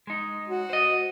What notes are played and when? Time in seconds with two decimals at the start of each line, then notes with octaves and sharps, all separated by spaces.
0.07 G#3 D#4
0.48 F#4
0.70 C5 D#5